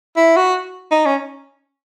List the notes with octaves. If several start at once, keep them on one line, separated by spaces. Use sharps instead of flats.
E4
F#4
D#4
C#4